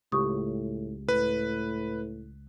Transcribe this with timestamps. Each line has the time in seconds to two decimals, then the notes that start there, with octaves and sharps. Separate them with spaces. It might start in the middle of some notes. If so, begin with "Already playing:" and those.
0.12 C#2 A2 G4 C#6 D#6
1.09 A2 B4